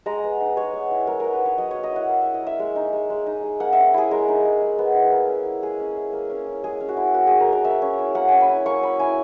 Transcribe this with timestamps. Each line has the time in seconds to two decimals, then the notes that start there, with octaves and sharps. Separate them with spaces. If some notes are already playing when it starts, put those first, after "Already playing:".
0.06 G#3 A#5
0.24 B3
0.40 D#4
0.57 G#3 C#5
0.74 B3
0.91 E4
1.07 G#3 A#4
1.20 B3 A#4
1.33 B4
1.41 D#4 C#5
1.58 F#3 D#5
1.71 A#3 C#5
1.83 D#5
1.92 E4 F#5
2.09 A#3
2.22 E4 E5
2.34 D#5
2.42 A#3 E5
2.59 G#3
2.76 D#4
2.93 G#3
3.10 G#3
3.26 D#4
3.43 G#3
3.60 A#3 F#5
3.73 E5
3.78 C#4
3.94 E4 G#4
4.11 G#3 A#4
4.28 D#4
4.45 G#3
4.61 G#3
4.79 B3
4.95 E4
5.12 A#3
5.29 C#4
5.45 E4
5.63 G#3 G#4
5.79 C#4
5.96 E4
6.13 A#3
6.30 C#4
6.46 E4
6.63 G#3 G#4
6.81 C#4
6.89 F#4
6.97 E4
7.14 A#3 F#4
7.27 D#4 G#4
7.40 A#4
7.48 A#3
7.53 A#4
7.65 A#3 E5
7.82 C#4
7.99 E4
8.15 A#3 F#5
8.28 C#4 G#5
8.41 B5
8.49 E4
8.66 A#3 C#6
8.83 C#4 B5
8.99 E4 G#5